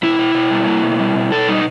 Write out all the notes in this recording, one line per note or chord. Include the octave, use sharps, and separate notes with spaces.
B2 E4
B2
B2
G3
A#3
B2
G3
B2
B2 A4
G3 D#4